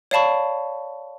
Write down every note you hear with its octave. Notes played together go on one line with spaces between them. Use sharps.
C#5 D5 F5 A5 B5 C#6